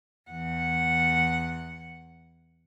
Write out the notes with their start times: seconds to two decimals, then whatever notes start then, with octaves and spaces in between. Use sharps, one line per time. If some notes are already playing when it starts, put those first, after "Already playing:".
0.30 E2 F#5